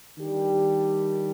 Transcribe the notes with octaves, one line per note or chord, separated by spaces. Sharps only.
D#3 G3 D4 G4